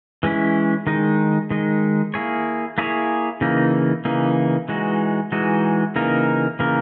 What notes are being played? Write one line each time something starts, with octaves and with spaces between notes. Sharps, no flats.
E3 G#3 C#4 E4
D#3 G#3 D#4
D#3 G#3 D#4
A#3 E4 G#4 C#5
A#3 E4 G#4 C#5
C#3 E3 A#3 D#4
C#3 E3 A#3 D#4
E3 G#3 D#4 F#4
E3 G#3 D#4 F#4
C#3 E3 A#3 D#4 A#4
C#3 E3 A#3 D#4 A#4